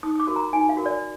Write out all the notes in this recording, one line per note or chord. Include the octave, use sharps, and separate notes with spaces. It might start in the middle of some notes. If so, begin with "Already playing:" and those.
D#4 D#6
D#6
D6
F#4 A#4
A#5
D#4 G#5
F5
F#4 A#4
D5